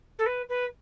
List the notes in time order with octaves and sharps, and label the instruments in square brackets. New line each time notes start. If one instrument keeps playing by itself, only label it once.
[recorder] A4
B4
B4